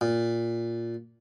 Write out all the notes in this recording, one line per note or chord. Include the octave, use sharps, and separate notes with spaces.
A#2